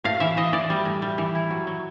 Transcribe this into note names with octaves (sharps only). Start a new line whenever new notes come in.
A2 F5
E3 E5
E3 D#5
E3 D5
G3
A2
G3
E3
E4
F#3
F#3